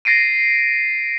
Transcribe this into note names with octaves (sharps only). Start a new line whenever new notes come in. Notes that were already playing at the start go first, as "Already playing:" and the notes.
A6 A#6 C7 D7 D#7